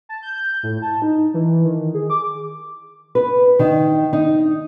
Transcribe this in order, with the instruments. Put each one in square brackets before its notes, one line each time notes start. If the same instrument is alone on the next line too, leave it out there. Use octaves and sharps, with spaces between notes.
[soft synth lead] A5
G6
A2
A5
D#4
E3
D#3
G#4
D6
[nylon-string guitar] B4
D#3
D#4